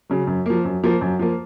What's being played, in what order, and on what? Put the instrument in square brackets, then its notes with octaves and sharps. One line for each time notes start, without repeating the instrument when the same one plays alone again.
[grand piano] C#3 F#3
F#2
F3 A#3
F#2
F3 A#3
F#2
F3 A#3